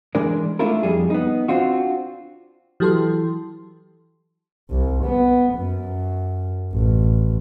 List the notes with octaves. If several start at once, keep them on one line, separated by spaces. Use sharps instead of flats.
E3 G#3 D4 A#4 D5
A3 A#3 D4 E4 F4 A#4
F2 G3 G#4
B3 D#4
C4 D4 F4 F#4
E3 F#3 G4 A4 C6
C2
B3
F#2
A1